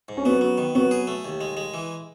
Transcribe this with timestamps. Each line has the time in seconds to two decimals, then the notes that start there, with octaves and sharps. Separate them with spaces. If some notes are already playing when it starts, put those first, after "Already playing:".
0.09 G#2
0.17 C#4
0.25 F#3 B3
0.41 F#3
0.58 D#3
0.75 F#3 B3
0.91 G#4
1.07 A3
1.24 D#2
1.41 G#3
1.57 G#3
1.74 E3